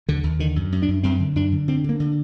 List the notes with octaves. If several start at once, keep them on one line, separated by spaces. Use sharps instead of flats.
D#2 D3
D#2
D3 D#3
F#2
F#2
D4
F#2
F#2 C4
D3
F#2 D4
D3
D3 C4
D3 A#3
D3